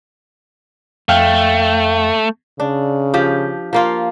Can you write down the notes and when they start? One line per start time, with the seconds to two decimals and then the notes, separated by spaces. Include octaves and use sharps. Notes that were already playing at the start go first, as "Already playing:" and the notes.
1.09 F2 A3 F5 G5
2.60 C#3 D4
3.14 F3 G4
3.73 F3 A#3 F4